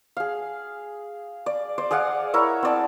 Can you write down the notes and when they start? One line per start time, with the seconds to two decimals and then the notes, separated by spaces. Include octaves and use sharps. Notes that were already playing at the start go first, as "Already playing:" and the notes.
0.17 G#4 F5
1.46 D5
1.78 C5 D5
1.91 G#4 D5 F5 F#5
2.34 E4 A#4 C#5 E5
2.63 C4 D5 A5